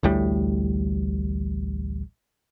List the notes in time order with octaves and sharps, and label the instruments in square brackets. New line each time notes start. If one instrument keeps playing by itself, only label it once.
[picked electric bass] A1 D2 A2 G3